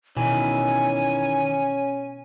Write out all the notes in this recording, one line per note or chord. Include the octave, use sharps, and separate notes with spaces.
B2 D#3 E3 C#4 G#5